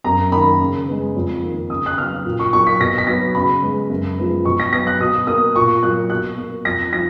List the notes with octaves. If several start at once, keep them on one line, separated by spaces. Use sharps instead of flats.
F#2 A#5
D#3 A#3 B5
C#3
G#3 B3
F2
D#3 A#3
C#3 D#6
F#6
F#3 B3 F6
A#2
C#6
F#3 A#3 C#6
B6
B2 A#6
B6
F#3 B3 A#6
C#3 B5
G#3 B3
F#2
F3 G#3 B3
B2 C#6
A#6
F#3 B3 A#6
F#6
B2 D#6
A#3 D#6
A#2 C#6
F#3 A#3 F#6
B2 F#6
A#3
F2 A#6
F3 A#6